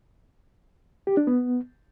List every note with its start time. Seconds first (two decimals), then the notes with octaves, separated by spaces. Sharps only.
1.07 G4
1.17 D4
1.27 B3